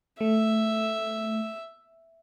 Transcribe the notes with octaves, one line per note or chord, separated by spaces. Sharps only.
A3 E5